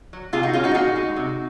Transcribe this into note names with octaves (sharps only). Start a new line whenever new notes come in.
F#3
C3 F4 G#4
D#4 F#4
D#3 G#3 C#4 F4
D#4 F#4
G#4
A#2 D#4 F#4
G#3
C3